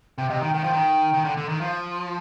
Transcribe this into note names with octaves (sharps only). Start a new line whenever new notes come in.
C3 G5
C3 D#5
D#3 G5
D#3 G5
F3
D#3
D#3
D3
D3
D#3
F3 F5